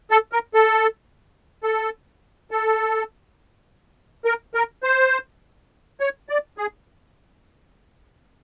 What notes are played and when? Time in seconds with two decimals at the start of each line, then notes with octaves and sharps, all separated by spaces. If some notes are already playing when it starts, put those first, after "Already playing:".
0.11 A4
0.32 A#4
0.54 A4
1.63 A4
2.51 A4
4.25 A#4
4.55 A#4
4.83 C5
6.00 C#5
6.29 D5
6.58 G#4